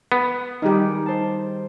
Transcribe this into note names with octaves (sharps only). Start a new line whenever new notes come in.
B3
D#3 G3 D#4 G4 G#4
C5 A5